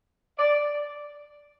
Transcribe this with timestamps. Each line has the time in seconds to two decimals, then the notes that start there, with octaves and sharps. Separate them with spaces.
0.39 D5